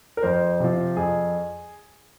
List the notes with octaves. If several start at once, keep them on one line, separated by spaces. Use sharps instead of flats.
A#4
F2 C5
C3 F3
F2 G#4